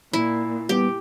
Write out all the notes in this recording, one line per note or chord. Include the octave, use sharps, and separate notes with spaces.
A#2 E4
G3 B3 G4